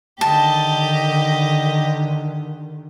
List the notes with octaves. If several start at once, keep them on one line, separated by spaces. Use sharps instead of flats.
D3 D#3 G4 D#5 A5